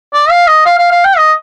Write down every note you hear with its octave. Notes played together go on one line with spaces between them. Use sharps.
D5
F5
D#5
F5
F5
F5
G5
D#5